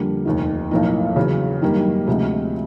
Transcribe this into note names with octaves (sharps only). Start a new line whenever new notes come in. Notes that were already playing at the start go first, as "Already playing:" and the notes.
Already playing: F2 D3 G3 A#3
F1 D#2 D#3
B1 A2 F3 A#3 D#4
E2 C#3 F#3
F#2 D#3 G3 A#3
D2 C3 F3 G#3